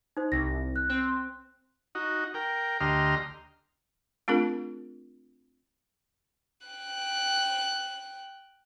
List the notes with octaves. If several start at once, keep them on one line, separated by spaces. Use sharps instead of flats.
D#4 C5
C2 A#6
F#6
C4
D#4 F#4
A#4 G5
D2 G4 D#5 A#5 C6 F6
A3 C4 D4 F4 G#4 A#4
G5 F#6